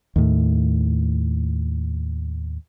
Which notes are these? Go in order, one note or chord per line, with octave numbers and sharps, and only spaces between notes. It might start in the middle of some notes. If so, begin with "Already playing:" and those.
D#2 A2